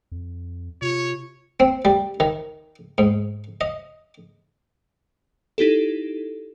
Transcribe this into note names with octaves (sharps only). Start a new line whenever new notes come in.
F2
C3 F4 C#5
C4
G3
D#3
G#2
D#5
D#4 E4 G4 A4